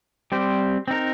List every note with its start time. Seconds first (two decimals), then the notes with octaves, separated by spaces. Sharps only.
0.32 G3 C4 G4 C5
0.88 C4 D#4 A#4